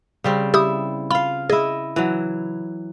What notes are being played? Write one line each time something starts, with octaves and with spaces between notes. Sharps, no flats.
C#3 G3 C4
E4 G4 D#6
F4 F5 B5
E4 G#4 D#5
E3 F#3